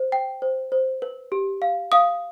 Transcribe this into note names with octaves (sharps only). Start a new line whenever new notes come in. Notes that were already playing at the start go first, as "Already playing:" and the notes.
Already playing: C5
G5
C5
C5
B4
G4
F5
F5 D#6